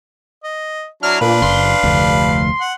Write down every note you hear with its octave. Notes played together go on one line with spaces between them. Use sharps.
D#5
F#3 D4 E4 F6
A#2 D4 B4 F5
F#1 C6
F1 D2
F#5